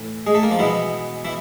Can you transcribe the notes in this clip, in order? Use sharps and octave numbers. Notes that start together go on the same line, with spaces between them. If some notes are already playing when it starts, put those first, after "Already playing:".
Already playing: A2 E3
G#3 G#4
A3 A4
A#3 A#4
F3 F4
B2 E3 G#3 B3 E4
E3 E4